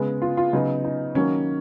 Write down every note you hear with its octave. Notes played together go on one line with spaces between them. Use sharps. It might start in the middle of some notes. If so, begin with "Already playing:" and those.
Already playing: C#3 G#3 B3
F4
F4
C#3 F#3 B3 D#4
D#4
D#3 F#3 A#3 C#4